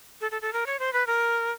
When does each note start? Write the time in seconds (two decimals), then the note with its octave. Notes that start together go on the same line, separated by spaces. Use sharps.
0.21 A4
0.31 A4
0.42 A4
0.53 A#4
0.66 C#5
0.79 C5
0.93 B4
1.07 A#4